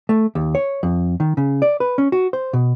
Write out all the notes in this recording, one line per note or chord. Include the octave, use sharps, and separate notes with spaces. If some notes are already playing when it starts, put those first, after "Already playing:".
A3
D#2
C#5
F2
D#3
C#3
D5
B4
C#4
F#4
C5
B2